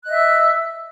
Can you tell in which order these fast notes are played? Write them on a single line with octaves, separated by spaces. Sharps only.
F#6 D#5 E5 E6